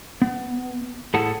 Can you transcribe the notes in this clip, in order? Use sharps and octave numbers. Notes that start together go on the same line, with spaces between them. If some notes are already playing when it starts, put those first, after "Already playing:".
B3
A2 G#4 A4 F#5 A5